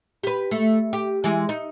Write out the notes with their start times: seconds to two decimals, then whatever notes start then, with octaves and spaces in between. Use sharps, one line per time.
0.23 G4 B4
0.51 A3
0.93 G4
1.24 E3 G#3
1.49 D#4